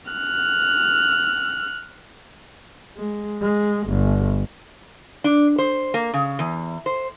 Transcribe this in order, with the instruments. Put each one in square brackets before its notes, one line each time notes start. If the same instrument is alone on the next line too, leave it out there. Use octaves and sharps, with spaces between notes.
[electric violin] F6 F#6
[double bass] G#3
G#3
G1
[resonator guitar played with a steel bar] D4
C5
A#3
C#3
E2
C5